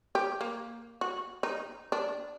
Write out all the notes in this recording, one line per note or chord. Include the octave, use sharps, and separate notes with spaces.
G4
A#3
F#4
D#4
D4